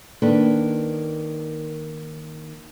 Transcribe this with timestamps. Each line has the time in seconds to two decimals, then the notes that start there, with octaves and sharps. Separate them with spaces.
0.22 D#3 A#3 D4 A4 B4